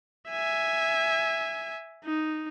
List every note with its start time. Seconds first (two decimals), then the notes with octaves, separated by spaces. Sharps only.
0.30 E5 G#5
2.05 D#4